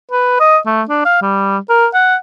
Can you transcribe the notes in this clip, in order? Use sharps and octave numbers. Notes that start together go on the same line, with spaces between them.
B4
D#5
A3
D4
F5
G3
A#4
F#5